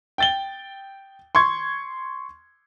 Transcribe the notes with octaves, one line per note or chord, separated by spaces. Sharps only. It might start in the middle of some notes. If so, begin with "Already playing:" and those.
G5 A6 G7
C6 C#6 G#6